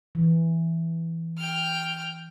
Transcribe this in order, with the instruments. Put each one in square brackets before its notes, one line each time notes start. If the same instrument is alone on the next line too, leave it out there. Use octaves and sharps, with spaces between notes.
[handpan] E3
[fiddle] G5 F6